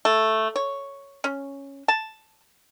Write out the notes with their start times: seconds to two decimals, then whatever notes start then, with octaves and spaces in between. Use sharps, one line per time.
0.05 A3
0.56 C#5
1.24 C#4
1.88 A5